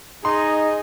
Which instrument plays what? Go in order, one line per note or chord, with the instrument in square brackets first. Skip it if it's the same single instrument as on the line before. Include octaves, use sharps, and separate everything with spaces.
[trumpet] D#4 [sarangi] G#4 [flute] D#5 [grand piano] C6